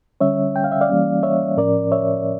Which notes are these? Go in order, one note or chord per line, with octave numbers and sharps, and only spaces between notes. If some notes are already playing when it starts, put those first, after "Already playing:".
D3 G3 C#4 C#5 E5
G5
F5
E5
D5 F5
E3 G3 A#3 C#4
C#5 E5
A2 F3 C#4 A#4 D5
C#5 E5